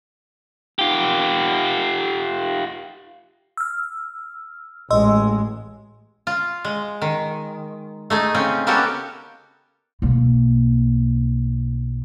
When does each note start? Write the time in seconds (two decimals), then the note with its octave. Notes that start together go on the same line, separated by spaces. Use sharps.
0.79 F4 G4
3.57 E6 F6
4.90 A1 G#3 D#5 C6 E6
6.27 F4
6.65 G#3
7.02 D#3
8.10 A3 D#4 G#4
8.34 C#3 C4 C#4
8.67 A#3 B3 C#4 F#4 G4 A4
10.02 B1 A#3